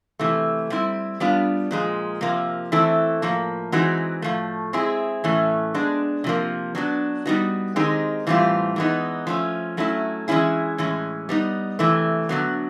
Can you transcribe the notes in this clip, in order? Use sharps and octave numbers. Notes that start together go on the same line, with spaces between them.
C3 E3 A3
G3 C4 E4
G3 B3 D4 F4
A#2 F3 G#3
C3 F3 A#3
E3 A3 C4 E4 A4
A2 F3 A#3
E3 G#3 C4 D#4 F#4
A2 F3 A3
G#3 C4 E4 G#4
A2 E3 A3 C#4
G#3 B3 D4
C3 F3 A#3
F#3 B3 D4
G3 B3 D#4 F#4
D#3 G#3 C4 D#4 G4
A2 E3 G3 C4 F4
E3 G#3 B3 D#4
F3 A3 C#4
F#3 A3 C#4 E4
E3 G#3 C#4 E4 G#4
A2 E3 G#3 C#4
G3 B3 D#4
C3 E3 A3
D3 F#3 B3